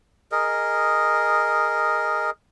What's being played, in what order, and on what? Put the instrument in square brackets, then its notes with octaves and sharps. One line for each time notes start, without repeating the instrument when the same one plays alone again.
[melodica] G#4 A#4 D#5